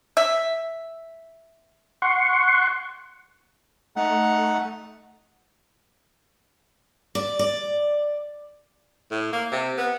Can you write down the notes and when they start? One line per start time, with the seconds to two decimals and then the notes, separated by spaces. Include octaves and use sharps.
0.17 E5
2.02 F#5 C6 C#6
3.96 A3 D#4 F#5
7.15 D5
7.39 D5
9.11 A2
9.33 A#3
9.52 C3
9.78 B3